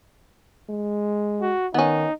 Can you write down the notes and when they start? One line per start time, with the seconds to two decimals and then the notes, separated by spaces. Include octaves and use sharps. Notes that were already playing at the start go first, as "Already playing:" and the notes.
0.69 G#3
1.41 F#4
1.74 D#3 B3 C#4 D#4